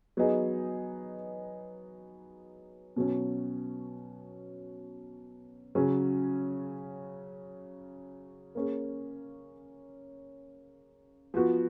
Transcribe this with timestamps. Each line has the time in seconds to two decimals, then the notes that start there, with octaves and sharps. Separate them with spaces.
0.17 F#3 B3 D#4 G#4
2.96 B2 F#3 C#4
5.75 C#3 F#3 C#4 G#4
8.55 A#3 C#4 G#4
11.34 F3 B3 F#4